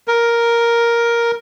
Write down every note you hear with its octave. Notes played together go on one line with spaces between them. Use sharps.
A#4